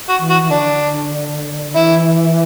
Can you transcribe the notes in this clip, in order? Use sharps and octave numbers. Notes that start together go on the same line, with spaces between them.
F#4
E3
F#4
E3
D3 D4
E3 E4